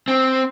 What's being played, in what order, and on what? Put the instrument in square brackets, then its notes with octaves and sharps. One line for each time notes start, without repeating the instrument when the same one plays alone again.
[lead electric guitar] C4